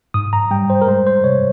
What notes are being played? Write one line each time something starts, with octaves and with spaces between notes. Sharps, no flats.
G#2 D#6
A#5
G3 G5
C5
A#4
G#3 C5
C5
C3 C#5